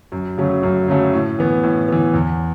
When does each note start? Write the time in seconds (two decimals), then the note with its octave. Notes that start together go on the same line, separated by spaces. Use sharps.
0.12 F#2
0.38 C#3 F#3 A3 C#4
0.63 F#2
0.88 C#3 F#3 A3 C#4
1.13 A2
1.38 E3 B3
1.64 A2
1.88 E3 B3
2.14 E2